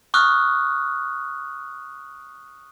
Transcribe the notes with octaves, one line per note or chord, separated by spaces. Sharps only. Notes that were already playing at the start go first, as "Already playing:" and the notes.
C#6 D#6 F6 F#6